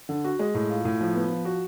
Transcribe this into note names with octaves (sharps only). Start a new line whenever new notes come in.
D3
F#4
G#3
A2
F4
A2
F3
B3
F3
F#4